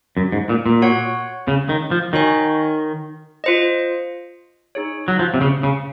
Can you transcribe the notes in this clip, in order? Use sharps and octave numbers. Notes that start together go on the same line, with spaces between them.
F#2
G#2
A#2
A#2
F#4 C#5 F#5
C#3
D#3
F3
D#3 F#4 C#5 G#5
F4 C5 D#5
D#4 G#4 C#5
F#3
F3
C3
C#3
C#3